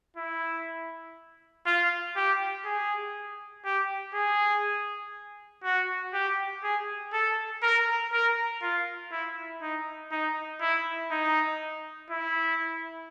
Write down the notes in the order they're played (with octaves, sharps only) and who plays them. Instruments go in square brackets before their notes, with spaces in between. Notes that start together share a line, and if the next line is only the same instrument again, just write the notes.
[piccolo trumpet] E4
F4
G4
G#4
G4
G#4
F#4
G4
G#4
A4
A#4
A#4
F4
E4
D#4
D#4
E4
D#4
E4